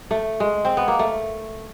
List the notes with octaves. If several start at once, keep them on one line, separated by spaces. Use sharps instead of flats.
A3
G#3
C4
B3
A#3
A3